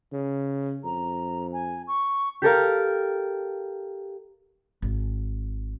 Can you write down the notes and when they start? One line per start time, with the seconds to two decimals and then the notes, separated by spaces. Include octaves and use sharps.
0.13 C#3
0.84 F2 A#5
1.53 G#5
1.88 C#6
2.42 G4 A4 A#4 F5
4.82 G#1